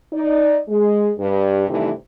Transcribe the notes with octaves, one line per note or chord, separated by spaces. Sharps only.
D#4 D5
G#3
G2
G2 C3 D#3 E3 A3